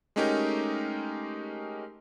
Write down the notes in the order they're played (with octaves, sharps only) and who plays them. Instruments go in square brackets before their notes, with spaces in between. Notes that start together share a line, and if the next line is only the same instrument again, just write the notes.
[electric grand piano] G#3 A3 C#4 D#4 G4 A#4